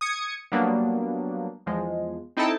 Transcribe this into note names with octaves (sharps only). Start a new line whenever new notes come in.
D#6 G#6 C#7
F#3 G3 A#3 B3 D4
E2 F3 G#3
C4 D#4 E4 A4 G5 A5